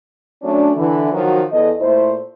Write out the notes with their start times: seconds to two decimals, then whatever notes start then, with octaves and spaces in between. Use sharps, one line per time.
0.42 F#3 A3 C#4 D4
0.76 D3 E3
1.12 D#3 F3 F#3 D#4 F#4
1.52 E2 A4 D#5
1.81 A#2 A3 E4 C5